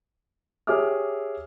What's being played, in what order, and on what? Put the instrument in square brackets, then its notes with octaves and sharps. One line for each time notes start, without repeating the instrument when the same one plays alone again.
[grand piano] G4 G#4 C#5 E5 D6 F6